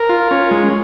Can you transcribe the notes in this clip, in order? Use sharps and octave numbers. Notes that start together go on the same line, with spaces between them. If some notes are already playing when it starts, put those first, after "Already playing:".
Already playing: A#4
F4
C#4
G#3